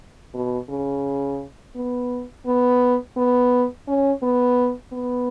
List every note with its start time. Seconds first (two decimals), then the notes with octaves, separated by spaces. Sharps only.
0.34 B2
0.69 C#3
1.75 B3
2.46 B3
3.17 B3
3.87 C#4
4.23 B3
4.93 B3